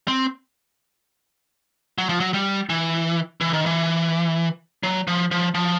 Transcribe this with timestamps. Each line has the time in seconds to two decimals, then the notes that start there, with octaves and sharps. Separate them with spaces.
0.08 C4
1.98 F#3
2.09 F3
2.20 F#3
2.34 G3
2.69 E3
3.41 E3
3.53 D#3
3.66 E3
4.83 F#3
5.07 F3
5.31 F3
5.54 F3